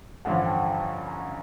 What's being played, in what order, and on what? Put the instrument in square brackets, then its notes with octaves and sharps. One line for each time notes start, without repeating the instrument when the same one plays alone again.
[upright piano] A1 G2 D3 F3 [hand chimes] F#5 G#5
[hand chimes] G5 A5
G#5 A#5
G#5 A#5